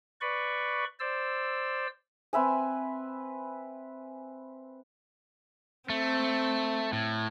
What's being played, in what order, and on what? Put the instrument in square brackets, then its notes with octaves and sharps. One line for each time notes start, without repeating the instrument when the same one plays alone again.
[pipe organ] B4 D5 B5 C#6
C5 D5 E6
[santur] C4 B4 E5 G#5
[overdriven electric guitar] A3 [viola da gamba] C4
[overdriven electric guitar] A2